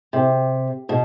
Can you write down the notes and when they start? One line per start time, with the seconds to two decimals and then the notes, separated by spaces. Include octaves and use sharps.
0.13 C3
0.89 B2